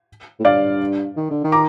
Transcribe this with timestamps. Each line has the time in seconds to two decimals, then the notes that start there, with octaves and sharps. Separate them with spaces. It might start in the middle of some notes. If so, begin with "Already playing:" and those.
0.39 A2
0.44 G2 D5 F5
1.16 D#3
1.31 D3
1.44 D#3
1.52 A#5 D6